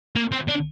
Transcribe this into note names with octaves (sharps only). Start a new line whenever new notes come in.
A#3
C4
D4